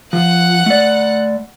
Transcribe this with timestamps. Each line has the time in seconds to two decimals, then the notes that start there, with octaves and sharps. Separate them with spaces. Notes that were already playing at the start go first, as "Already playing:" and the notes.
0.13 F3 F#5 F#6
0.66 A3 D5